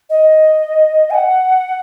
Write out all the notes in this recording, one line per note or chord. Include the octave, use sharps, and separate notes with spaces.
D#5
G#5
F#5